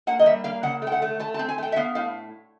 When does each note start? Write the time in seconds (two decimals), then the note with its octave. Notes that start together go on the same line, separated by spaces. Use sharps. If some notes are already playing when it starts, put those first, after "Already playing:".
0.07 A#3 F#5
0.19 D#5
0.26 G3 E5
0.44 A#3 F5
0.63 C#3 F#5
0.82 A3
0.87 G5
0.92 F#5
1.02 A3
1.19 A3 A5
1.34 A5
1.39 C4
1.49 G#5
1.58 A3 G5
1.72 E5
1.76 B3 F5
1.95 A2 F5